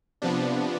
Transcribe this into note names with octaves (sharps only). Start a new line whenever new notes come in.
C3 F3 B3 D4